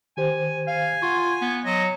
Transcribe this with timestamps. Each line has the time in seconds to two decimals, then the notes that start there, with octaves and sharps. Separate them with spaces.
0.17 D#3 G4 C5 G#5
0.67 F5 G#5
1.02 F4 F#5 C#6
1.41 B3
1.65 F#3 D#5